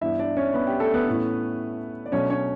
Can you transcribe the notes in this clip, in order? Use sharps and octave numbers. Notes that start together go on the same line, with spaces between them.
G2 E3 B3 D4 E4 E5
D4 D5
C#4 C#5
B3 B4
G4
A3 A4
B3 B4
A2 E3 A3 C#4
D5
B2 F#3 A3 C#4 D4 C#5
C#4 C#5